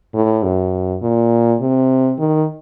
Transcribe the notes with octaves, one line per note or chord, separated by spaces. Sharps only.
A2
F#2
A#2
C3
D#3